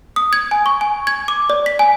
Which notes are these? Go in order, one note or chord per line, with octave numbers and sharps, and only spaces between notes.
D#6
G#6
G#5
C#6
G#5
G#6
D6
D5
B6
G#5